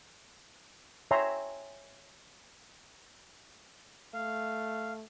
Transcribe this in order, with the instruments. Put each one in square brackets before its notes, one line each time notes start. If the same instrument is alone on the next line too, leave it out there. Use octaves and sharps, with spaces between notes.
[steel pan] C#5 E5 G5 G#5 A#5 C6
[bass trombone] A3 [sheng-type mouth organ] F5